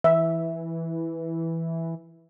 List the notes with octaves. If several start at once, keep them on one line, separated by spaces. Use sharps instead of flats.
E3 E5